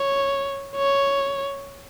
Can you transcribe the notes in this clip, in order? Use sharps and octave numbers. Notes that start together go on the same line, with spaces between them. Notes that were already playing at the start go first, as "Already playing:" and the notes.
Already playing: C#5
C#5